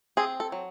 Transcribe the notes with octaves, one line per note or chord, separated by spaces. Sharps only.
C4 G#4
A4
F#3